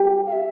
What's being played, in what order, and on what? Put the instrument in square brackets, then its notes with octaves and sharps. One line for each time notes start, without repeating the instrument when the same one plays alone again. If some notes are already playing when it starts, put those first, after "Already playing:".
Already playing: [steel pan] G4
[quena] F5
E5